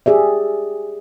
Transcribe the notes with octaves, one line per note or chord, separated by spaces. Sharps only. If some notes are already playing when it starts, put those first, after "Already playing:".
G4 G#4 D5 E5